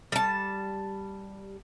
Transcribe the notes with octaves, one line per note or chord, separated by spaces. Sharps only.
G3 A5